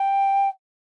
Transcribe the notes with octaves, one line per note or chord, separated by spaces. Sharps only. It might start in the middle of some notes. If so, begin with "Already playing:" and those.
Already playing: G5